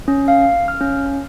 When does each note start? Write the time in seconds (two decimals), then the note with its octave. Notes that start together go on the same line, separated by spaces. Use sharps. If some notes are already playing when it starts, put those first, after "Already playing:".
0.08 C#4
0.28 F5
0.68 F6
0.81 C#4